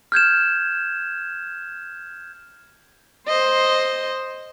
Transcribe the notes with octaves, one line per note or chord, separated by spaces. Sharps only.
F6 G6 G#6 E7
C5 D#5 C6